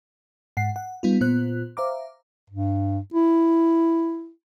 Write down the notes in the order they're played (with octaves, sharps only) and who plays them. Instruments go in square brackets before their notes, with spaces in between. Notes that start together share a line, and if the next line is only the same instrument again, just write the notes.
[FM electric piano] G#2 F#5 C7
F#5
G3 B3 D#4 F4
A#2 B3 F4 C5 F#6
C5 E5 F5 A#5 D6
[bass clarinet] G2
E4